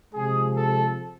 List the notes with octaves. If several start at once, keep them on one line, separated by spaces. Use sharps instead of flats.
C3 F3 G#3 G#4
A4